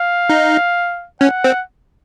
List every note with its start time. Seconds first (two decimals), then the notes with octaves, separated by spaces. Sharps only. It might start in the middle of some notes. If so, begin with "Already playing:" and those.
Already playing: F5
0.29 D#4
1.21 C#4 F#5
1.44 C4